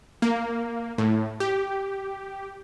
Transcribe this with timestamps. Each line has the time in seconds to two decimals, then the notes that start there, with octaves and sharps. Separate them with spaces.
0.22 A#3
0.98 A2
1.40 G4